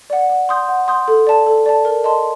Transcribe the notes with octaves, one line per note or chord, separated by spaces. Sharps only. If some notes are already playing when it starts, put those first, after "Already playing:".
D5 F#5
F#5
C6 D#6 G6
F#5
C6 D#6 G6
A4
D5 A5
A4
D5 A5
A#4
D#5 A5 C6